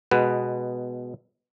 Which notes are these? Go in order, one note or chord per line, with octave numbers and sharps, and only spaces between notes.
B2 G#3 B3 B4